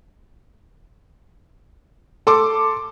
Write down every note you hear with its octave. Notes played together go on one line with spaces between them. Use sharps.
A4 C6 D6